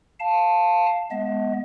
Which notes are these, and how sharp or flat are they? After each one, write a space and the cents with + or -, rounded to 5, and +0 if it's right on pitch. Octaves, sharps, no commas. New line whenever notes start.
F5 +0 A5 +0
G#3 +0 B3 +0 D#5 +35